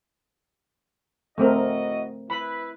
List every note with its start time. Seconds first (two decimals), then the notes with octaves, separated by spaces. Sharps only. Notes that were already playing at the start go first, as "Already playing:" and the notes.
1.38 A3 C4 E4 F#4 A#4 D#5
2.30 E4 B4 B5